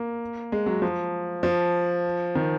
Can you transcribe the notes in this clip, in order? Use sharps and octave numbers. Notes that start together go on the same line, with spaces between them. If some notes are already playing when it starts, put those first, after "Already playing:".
Already playing: A#3
G#3
F#3
F3
F3
D#3